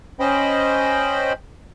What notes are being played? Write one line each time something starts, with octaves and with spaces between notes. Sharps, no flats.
C#4 C5 D#5 G5 B5